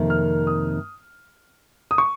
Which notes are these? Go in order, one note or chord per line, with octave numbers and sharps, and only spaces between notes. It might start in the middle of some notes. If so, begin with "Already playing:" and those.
Already playing: F2 C3 D#3 A#3
F6
D#6
D#6
C#6